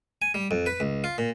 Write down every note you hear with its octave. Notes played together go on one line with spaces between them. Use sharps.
G#5
G3
F2
B4
C#2
F4
A#2